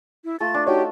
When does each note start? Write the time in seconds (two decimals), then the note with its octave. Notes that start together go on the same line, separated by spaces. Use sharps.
0.25 E4
0.40 A3 F4 A4 A6
0.54 D4
0.67 D#4 F#4 G4 C#5 D#5